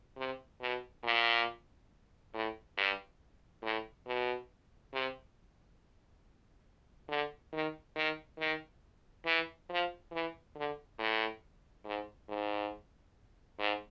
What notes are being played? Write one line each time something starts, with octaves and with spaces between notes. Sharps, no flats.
C3
B2
A#2
A2
G2
A2
B2
C3
D3
D#3
D#3
D#3
E3
F3
E3
D3
A2
G#2
G#2
G#2